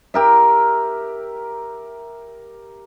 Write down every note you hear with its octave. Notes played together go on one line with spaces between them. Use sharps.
G4 A#4 E5